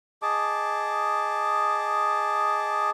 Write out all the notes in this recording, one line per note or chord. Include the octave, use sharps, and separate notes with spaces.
G#4 D#5 A5 D6